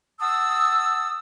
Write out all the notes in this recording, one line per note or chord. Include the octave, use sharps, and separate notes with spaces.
F#5 A5 D#6 E6